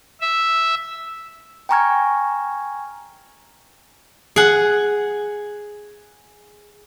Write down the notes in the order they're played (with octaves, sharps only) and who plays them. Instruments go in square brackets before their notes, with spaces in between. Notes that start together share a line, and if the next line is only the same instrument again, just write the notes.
[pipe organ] E5
[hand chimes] G5 G#5 A#5 C#6 F6 G#6
[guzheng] G#4 F#5